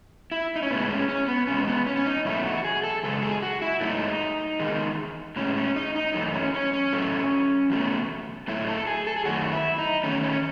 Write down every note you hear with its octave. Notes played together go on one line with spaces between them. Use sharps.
E4
D#4
C#4
A2 G#3 B3
C#4
C#4
B3
B2 G#3 C#4
C#4
B3
C#4
C#4
D#4
E2 B2 F#3 A3 E4
F#4
G#4
A4
F#2 C#3 G#3 A4
G#4
F#4
E4
G#2 F#3 A3 D#4
E2 D#3 G#3
A2 G#3 C#4
C#4
D#4
D#4
F#2 E3 A3 D#4
C#4
C#4
C#4
A2 F#3 A3
E2 B2 F#3 A3
A2 F#3 A3 E4
A4
G#4
A4
G#4
F#2 D#3 F#3 A3 F#4
E4
D#4
E2 D#3 A3 C#4
C#4